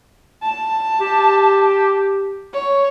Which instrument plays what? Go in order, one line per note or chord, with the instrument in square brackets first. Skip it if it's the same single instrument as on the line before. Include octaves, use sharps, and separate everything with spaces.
[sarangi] A5
[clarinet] G4
[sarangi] C#5